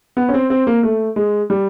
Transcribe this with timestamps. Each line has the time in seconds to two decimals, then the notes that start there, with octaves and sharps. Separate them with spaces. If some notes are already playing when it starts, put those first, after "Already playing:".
0.17 B3
0.29 C#4
0.34 C4
0.50 C4
0.67 A#3
0.83 A3
1.16 G#3
1.50 G3